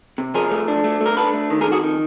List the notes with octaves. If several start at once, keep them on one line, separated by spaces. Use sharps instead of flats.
C3
F3 G#4 A#4
A3
D4
A3
A3
A#4
D4 A4 B4
A3
D#3
G#4 A#4
F2
F#4 G#4
D#3